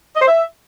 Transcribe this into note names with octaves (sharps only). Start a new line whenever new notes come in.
D#5
C5
E5